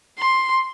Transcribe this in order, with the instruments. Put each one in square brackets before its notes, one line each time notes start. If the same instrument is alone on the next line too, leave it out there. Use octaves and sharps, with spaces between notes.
[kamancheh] C6